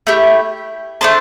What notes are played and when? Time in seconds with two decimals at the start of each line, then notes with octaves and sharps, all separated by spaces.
0.07 A3 E4 G4
1.01 A3 D4 C5 A5